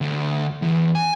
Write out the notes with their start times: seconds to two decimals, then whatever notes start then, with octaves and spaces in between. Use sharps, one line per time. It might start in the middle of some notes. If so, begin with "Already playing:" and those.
0.01 D2
0.62 E2
0.95 G#5